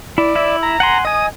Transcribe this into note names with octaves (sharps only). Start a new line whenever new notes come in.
E4 D5
E4 E5
A#5
F#5 G#5 C6
D#5 G#5 D#6